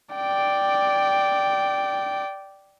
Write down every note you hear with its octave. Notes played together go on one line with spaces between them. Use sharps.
D5 G5